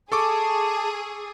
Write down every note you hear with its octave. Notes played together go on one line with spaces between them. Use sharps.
G#4 A4 A5 C#6 D6